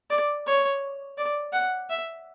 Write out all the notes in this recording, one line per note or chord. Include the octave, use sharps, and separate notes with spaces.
D5
C#5
D5
F#5
E5